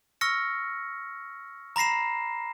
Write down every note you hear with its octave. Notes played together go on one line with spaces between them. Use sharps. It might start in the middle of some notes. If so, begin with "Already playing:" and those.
C#6 E6 F6 A#6 C#7
A#5 B5 A#6 C7 E7